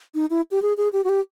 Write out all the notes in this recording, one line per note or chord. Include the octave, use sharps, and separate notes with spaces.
D#4
E4
G4
G#4
G#4
G4
F#4
G4